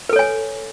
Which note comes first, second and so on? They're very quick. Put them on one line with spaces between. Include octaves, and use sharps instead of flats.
B4 A4 C#5 G#5